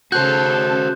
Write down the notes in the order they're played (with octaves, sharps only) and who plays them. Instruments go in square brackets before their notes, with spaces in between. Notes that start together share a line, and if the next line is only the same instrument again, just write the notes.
[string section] C#3 A4 [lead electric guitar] F#4 C5 [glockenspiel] F#6 G6